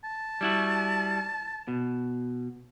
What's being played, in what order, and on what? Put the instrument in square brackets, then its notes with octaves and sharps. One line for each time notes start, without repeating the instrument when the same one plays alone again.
[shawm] A5
[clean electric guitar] G3 E4 F#4
B2